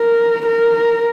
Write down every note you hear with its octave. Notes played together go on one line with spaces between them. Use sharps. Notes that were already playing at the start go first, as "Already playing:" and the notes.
Already playing: A#4
A#4